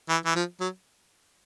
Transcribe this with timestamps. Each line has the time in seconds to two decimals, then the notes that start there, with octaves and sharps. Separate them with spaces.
0.09 E3
0.26 E3
0.35 F3
0.60 F#3